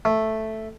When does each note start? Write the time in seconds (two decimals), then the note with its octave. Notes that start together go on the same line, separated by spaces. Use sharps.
0.05 A3